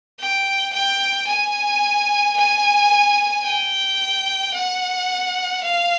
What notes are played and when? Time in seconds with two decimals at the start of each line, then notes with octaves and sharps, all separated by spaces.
0.20 G5
0.73 G5
1.27 G#5
2.37 G#5
3.45 G5
4.54 F#5
5.64 F5